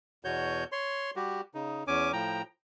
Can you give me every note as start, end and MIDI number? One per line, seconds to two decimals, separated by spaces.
0.25 0.64 40
0.25 0.64 47
0.25 0.64 66
0.25 0.64 73
0.25 0.64 91
0.72 1.11 73
0.72 1.11 84
1.16 1.41 55
1.16 1.41 66
1.16 1.41 67
1.54 1.83 49
1.54 1.83 63
1.87 2.12 40
1.87 2.12 61
1.87 2.12 80
1.87 2.12 86
2.13 2.42 45
2.13 2.42 53
2.13 2.42 79
2.13 2.42 82